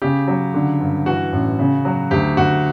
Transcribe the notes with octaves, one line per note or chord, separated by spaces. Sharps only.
C#3 G4
F#3
D3
G2
E3 F#4
A1
C#3
F#3
D2 G4
D2 F#4